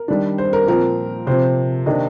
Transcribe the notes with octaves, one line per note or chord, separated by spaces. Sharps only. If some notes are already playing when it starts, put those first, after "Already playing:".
Already playing: A#4
D#3 G3 D4
C5
A#4
A#2 F3 C4 A#4
C3 F3 C4 C5
C3 D#3 A#3 D4 D#5